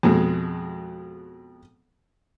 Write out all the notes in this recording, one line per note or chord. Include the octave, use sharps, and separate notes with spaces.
F2 B2 G#3